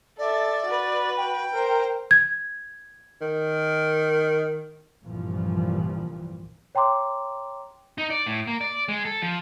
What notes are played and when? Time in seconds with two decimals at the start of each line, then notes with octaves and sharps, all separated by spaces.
0.18 A4 D5 E5
0.67 F#4 B4
1.17 G5
1.52 A#4 C5
2.11 G#6
3.21 D#3
5.05 C2 G2 A#2 E3 F3 G3
6.75 C#5 G5 A#5 C6 D6
7.98 D#4
8.10 D5
8.26 A2
8.47 A#3
8.61 D5
8.88 G#3
9.05 A4
9.22 F3